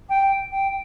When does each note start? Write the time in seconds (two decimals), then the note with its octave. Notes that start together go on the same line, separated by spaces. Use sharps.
0.09 G5
0.51 G5